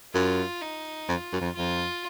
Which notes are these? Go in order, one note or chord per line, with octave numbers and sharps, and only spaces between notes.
F#2 F4
D#4
F2 F4
F#2
F2
F2 F4